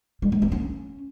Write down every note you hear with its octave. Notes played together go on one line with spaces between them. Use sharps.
G3
G#3
C4
C#4